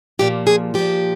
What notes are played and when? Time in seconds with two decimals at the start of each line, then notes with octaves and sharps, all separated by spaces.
0.19 A#2 F3 G4
0.47 G#4
0.74 A#2 F3 G4